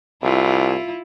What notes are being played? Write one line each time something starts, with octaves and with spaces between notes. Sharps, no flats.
C2 E4 F4